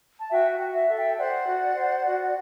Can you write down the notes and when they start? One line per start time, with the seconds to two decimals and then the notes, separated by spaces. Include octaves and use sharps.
0.19 A5
0.31 F#4 E5 G5
0.59 F#4
0.75 E5
0.89 A4
0.96 E5 G5
1.17 C5 D5 F#5
1.47 F#4
1.76 C5
2.05 F#4